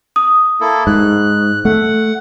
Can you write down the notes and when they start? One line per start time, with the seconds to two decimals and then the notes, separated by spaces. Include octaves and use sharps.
0.16 D#6
0.61 A#3 E4 A4
0.87 G#2 F#6
1.65 A3 F#5